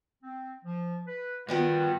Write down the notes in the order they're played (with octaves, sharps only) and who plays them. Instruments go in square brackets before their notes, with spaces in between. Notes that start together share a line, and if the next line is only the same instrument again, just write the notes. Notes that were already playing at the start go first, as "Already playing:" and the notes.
[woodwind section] C4
F3
B4
[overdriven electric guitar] G2 G5 [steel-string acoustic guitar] D3 F3 B3 [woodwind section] D#3 [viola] F#4